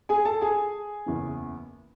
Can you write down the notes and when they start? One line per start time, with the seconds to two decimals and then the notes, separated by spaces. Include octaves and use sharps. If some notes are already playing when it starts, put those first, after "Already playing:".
0.09 G#4 G#5
0.25 A4 A5
0.41 G#4 G#5
1.06 F#1 E2 C#3 E3